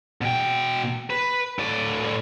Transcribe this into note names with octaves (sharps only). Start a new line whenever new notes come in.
B2 G5
B4
A2 D5